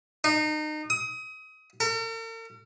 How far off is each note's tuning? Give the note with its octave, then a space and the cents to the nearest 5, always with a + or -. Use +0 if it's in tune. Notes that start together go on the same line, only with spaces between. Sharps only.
D#4 -30
D#6 +30
A#4 -45